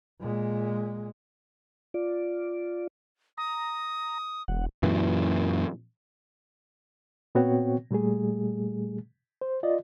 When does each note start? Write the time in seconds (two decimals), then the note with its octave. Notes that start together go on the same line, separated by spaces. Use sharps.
0.20 A#2 G#3
1.94 F4 D5
3.38 A#5 D#6
4.48 E1 F#5
4.83 F#2 A#2 E3
7.35 A#2 B3 C4 F#4 C#5 G5
7.90 A#2 G3 A3 G#4
9.41 C5
9.63 F4 D5 D#5